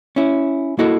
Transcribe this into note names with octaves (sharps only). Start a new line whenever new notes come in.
C#4 E4
A#3 E4 F#4 A4 D#5